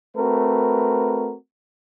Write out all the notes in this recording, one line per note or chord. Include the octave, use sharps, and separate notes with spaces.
A3 C4 F#4 A#4 B4